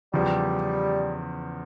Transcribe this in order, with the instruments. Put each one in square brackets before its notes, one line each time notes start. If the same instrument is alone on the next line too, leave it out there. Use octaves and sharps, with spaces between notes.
[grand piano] E2 C#3 F3 [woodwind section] G3